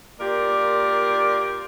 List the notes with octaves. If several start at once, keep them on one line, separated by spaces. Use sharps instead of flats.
A#3 F4 G4 A#4 D5